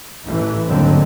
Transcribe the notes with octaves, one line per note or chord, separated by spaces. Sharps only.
A1 E3
G1 D#2 G#2 D3 F#3 C4